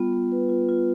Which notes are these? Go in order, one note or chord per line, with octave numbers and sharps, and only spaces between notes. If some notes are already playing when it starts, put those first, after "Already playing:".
Already playing: G3 B3 F4
B3
B4
F4
F4